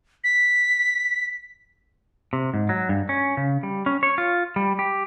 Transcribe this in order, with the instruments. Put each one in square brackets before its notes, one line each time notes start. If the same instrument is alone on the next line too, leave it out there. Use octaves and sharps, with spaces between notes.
[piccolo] B6
[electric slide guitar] C3
G#2
F#3
G2
C#4
C#3
G3
C#4
C#5
F4
G3
G4